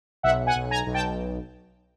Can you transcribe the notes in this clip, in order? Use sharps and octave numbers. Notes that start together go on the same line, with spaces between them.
B1 E5 F#5
F#5 G#5
B1
G#5 A#5
B1
G5 A5